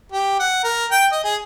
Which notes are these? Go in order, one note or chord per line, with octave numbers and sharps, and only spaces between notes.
G4
F#5
A#4
G5
D#5
G#4